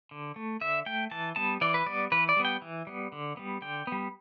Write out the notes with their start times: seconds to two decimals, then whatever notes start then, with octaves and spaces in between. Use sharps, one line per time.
0.11 D3
0.36 A3
0.61 D3 E5
0.86 A3 G5
1.11 E3 A5
1.36 G3 B3 A5
1.61 E3 D5
1.74 B4
1.86 G3 B3 D5
2.12 E3 B4
2.29 D5
2.37 G3 B3
2.45 G5
2.62 E3
2.87 G3 B3
3.12 D3
3.37 G3 B3
3.62 D3 G5
3.87 G3 B3